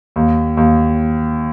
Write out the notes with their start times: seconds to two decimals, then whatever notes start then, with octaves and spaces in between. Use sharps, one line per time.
0.16 D#2
0.57 D#2